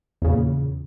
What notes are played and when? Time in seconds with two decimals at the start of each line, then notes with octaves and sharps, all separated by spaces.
0.22 E2
0.24 C#3
0.27 A#2